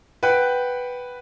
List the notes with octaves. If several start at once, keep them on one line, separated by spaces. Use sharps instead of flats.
B4 F#5 G5 F#6